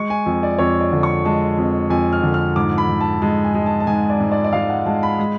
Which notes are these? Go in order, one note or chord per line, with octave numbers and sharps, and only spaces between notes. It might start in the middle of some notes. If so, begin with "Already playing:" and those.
Already playing: G#3 C#6
G#5
F2
D5
F2 C#5
D5
D3
C#6
G#3 A5
F2
F2 G#5
F6
D3
F6
G#2 D6
B5
G#2
A5
G#3 A5
G#5
G#3
A5
A5
G#2 G#5
D5
G#2
D5
D5
G#3 F5
F#5
G#3 A5
B5
G#3